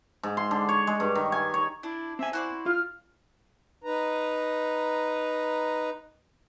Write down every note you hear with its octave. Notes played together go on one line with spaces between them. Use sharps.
G#2
C6
D3
C#5
G#3
G2
D#3
G#5
C#5
D4 E4
C4 E5 G#5
E4 F#4 C5 D5
F4 F6
D#4 B4 A#5